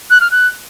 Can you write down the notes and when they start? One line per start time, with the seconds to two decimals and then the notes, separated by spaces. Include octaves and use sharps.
0.10 F#6
0.21 F6
0.31 F#6